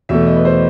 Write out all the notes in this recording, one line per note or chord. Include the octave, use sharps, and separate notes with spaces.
E2 B2 A3 E5
D#5
B4
C5